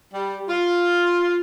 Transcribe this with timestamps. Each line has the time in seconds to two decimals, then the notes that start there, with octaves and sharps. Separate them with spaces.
0.14 G3
0.49 F4